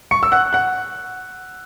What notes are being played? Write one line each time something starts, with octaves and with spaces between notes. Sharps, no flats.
C#6 C#7
E6
F#5 F#6
F#5 F#6